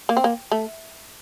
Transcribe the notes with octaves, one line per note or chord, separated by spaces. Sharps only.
A#3
C4
A#3
A3